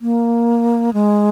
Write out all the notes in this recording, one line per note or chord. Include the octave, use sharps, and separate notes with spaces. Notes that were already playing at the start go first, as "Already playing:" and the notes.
A#3
G#3